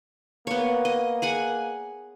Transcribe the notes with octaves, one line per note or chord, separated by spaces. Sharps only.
A#3 B3 C#5
D#5
G#4 F#5 G#5